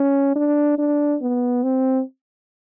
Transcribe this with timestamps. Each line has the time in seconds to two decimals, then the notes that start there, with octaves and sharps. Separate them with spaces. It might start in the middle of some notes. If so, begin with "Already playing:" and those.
Already playing: C#4
0.36 D4
0.78 D4
1.21 B3
1.63 C4